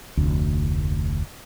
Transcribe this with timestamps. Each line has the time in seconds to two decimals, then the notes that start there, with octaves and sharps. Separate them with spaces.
0.17 F1 D2